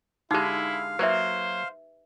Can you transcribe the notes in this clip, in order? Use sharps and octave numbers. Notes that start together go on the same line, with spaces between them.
D3 G#3 D#4 E4 G4 F5
F#3 A#3 B4 C5 E5